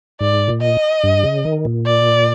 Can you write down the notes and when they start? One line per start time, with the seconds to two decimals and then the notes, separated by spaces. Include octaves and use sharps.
0.21 G#2 D5
0.48 A#2
0.61 D#5
1.04 G2
1.23 C#3
1.45 D#3
1.65 A#2
1.86 D5